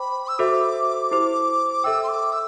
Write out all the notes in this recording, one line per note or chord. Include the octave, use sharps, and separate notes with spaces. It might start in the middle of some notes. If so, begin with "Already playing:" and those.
Already playing: C5 G5 B5 D6
E6
F#4 A4 C5 E5 D6
E4 G4 C5
A4 E5 G5 E6
C6
D6
E6